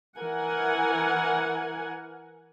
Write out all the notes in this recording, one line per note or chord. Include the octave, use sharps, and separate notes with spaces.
E3 A#4 F#5 G#5